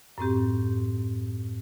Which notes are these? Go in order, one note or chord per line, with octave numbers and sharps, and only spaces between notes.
F#2 A2 C4 G4